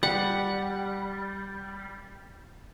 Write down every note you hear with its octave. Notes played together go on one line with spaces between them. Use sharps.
G3 F#5